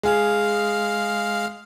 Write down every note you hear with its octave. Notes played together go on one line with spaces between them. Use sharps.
G#3 G#4 F5 F6